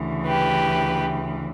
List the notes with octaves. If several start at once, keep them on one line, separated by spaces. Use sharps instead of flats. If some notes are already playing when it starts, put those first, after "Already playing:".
Already playing: D2 C#3 E3
G4 B4